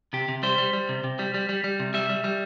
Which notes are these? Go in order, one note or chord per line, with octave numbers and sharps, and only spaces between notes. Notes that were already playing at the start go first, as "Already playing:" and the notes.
C3 G4
C3
G3 C5
G3
G3
C3
C3
G3
G3
G3
G3
C3
G3 E5
G3
G3